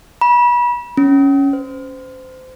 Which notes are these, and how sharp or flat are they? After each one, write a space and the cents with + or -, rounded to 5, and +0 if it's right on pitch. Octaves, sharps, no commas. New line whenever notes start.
B5 -30
C#4 +0
C5 -25